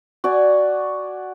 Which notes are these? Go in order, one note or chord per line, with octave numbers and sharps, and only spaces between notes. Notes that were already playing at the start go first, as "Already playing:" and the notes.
F#4 D5 G#5